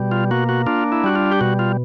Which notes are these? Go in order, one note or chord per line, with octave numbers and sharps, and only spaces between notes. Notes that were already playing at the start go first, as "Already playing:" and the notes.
Already playing: B2 G3
F4
A#3 F#4
F#4
D4 F4
E4
G3 F#4
F4
G4
B2 F#4
F4